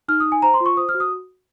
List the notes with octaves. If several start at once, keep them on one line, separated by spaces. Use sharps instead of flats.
D#4 F6
D#6
D#4
G#5
C5 A#5
C6
F4
C#6
C5 D#6
F6
F#4
D#6